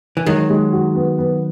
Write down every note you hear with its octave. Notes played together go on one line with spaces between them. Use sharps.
E3
D#3 F#3 G#3
G#3
F#4
B3
B3